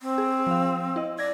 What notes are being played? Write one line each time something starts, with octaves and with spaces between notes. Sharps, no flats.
C4
G#4
F3 F5
E4 D#5
D5 G#6 A#6